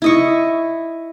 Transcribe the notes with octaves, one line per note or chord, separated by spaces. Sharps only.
E4 D#5 C#6